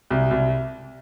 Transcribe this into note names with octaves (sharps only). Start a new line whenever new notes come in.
C2
C2